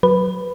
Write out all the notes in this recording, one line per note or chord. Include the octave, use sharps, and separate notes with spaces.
F#3 B4